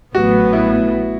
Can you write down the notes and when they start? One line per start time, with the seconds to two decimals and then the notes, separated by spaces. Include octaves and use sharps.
0.14 A1 A2 F#3 B3 F#4
0.53 E4